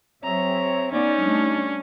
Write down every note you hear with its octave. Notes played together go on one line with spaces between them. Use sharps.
F#3 C4 G#4 C#5 E5 A#5
B3 C#4 D#4 D5
G3 A3 D4